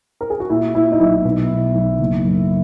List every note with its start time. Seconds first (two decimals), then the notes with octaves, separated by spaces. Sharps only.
0.21 A#4
0.30 G#4
0.40 F#4
0.50 A#2 E4
0.75 A#2 E4
0.92 D#4
1.00 B1 E4
1.25 B2
1.50 B2
1.75 B1
1.99 F#1
2.25 F#2